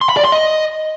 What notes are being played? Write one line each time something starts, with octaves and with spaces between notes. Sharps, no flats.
C6
B5
D5
C6
D#5